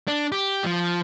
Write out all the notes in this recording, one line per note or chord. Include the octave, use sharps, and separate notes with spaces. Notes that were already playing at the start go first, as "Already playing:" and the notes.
D4
G4
F3